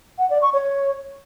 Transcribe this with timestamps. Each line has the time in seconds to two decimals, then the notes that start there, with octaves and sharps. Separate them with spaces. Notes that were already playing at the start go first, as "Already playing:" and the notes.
0.19 F#5
0.30 D5
0.42 C#6
0.53 C#5